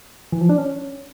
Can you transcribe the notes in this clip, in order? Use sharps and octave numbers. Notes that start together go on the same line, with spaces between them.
E3
F3
D4
C#4